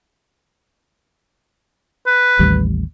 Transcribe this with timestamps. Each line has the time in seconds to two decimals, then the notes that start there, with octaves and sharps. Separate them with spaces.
2.06 B4
2.39 A1 D#2 G3